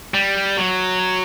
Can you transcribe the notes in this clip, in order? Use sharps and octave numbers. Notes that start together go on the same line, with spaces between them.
G3
F#3